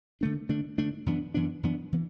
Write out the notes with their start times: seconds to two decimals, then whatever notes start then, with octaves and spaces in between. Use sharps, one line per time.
0.21 D3 A3 D4
0.49 D3 A3 D4
0.78 D3 A3 D4
1.06 F#2 E3 B3 D4
1.34 F#2 E3 B3 D4
1.63 F#2 E3 B3 D4
1.92 E3 B3